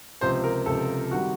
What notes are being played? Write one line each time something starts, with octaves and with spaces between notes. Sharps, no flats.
C#2 C3 F3 C5
A#4
C#2 C3 F3 A4
C3 D#3 G3 F#4